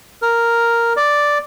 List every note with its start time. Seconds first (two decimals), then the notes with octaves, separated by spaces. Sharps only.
0.22 A#4
0.97 D5